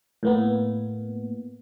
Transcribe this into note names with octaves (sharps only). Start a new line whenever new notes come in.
A2 A#3 B3